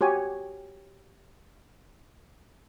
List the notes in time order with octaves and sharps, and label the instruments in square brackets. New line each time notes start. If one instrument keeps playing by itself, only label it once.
[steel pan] F#4 G4 C#5 G#5